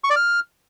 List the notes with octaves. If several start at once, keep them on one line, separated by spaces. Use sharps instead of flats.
C#6
D5
F6